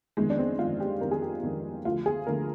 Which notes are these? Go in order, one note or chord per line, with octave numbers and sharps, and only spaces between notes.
G1 F2 D#3 G#3
D4
C4
G1 F2 D#3 F4
G4
G1 F2 D#3 A#4
G#4
G4
G1 F2 D#3
D2 D3 F3 F4
G#4
D2 D3 F3 A#4